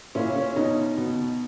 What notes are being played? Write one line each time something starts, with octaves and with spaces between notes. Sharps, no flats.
A#2 C#4 E4
C#4
B2 D#4
B2